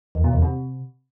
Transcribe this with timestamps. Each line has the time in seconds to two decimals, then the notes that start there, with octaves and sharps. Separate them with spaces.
0.15 E2
0.24 B2
0.33 E2
0.42 C3